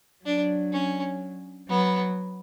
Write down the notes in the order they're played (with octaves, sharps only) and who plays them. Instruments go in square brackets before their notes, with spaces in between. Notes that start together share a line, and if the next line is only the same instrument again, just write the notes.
[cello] F#3 [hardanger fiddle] D4
[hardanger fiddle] C#4
[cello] F#3 [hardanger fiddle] B3